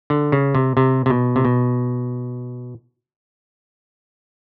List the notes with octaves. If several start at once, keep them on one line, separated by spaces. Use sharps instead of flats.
D3
C#3
C3
C3
C3
B2
C3
B2